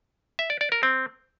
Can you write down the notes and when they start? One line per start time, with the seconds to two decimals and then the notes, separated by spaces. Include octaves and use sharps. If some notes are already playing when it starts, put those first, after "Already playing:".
0.39 E5
0.50 D5
0.61 D5
0.72 A#4
0.83 C4